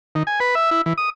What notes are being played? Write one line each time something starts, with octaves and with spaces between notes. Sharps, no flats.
D#3
G#5
B4
E5
E4
E3
D#6